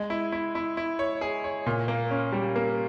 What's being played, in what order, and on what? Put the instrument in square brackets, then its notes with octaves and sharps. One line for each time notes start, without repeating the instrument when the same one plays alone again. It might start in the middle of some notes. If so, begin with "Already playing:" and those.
Already playing: [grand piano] G#3
E4
E4
E4
E4
C#5
G#4
C#5
A#2
A#3
C#4
G3
A#3